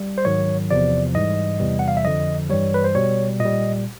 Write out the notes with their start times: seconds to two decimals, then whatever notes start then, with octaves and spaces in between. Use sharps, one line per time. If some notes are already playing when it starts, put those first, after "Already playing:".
Already playing: G3
0.18 C5
0.25 G#2 D#3 F#3 C#5
0.71 E2 C3 F3 D5
1.15 G#2 E3 G3 D#5
1.60 E2 C3 E3 G3
1.79 F#5
1.88 F5
1.97 E5
2.04 F2 D3 F3 D#5
2.50 G2 E3 G3 C#5
2.74 B4
2.84 C5
2.95 B2 G3 C#5
3.40 A#2 G3 D#5